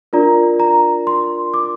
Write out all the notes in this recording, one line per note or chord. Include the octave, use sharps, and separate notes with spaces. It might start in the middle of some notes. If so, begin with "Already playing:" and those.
D4 F4 A#4 D5 A#5
A#5
C6
D6